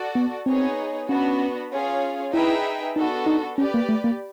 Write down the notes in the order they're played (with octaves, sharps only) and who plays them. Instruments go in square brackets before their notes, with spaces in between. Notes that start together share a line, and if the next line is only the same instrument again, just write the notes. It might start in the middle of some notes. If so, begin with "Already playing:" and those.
Already playing: [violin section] F#4 A4 D5
[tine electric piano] B3
[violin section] B3 D#4 G#4 C#5 [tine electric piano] C4
[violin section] B3 D4 F#4 [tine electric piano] C#4
[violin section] C#4 F4 G#4 C#5 F5
[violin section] D#4 G#4 B4 E5 G5 [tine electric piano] E4
[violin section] B3 D4 F#4 A4 [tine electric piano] D#4
[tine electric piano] D#4
[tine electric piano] C#4 [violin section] G4 B4 D5
[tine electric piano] A#3
A3
A#3